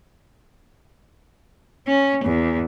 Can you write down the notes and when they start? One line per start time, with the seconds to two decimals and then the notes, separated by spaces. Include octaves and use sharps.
1.87 C#4
2.24 E2